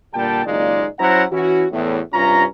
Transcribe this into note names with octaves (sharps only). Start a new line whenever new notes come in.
A#2 D3 G3 G5 A5
F#1 D#2 G#3 D#4 F4 D5
F#3 C#4 E4 C5 F#5 A#5
E3 C#4 E4 F#4
E2 A2
G2 C3 C#4 F4 A#5